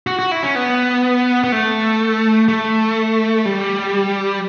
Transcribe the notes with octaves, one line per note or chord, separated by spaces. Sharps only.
F#4
F#4
E4
C#4
B3
B3
A3
A3
G3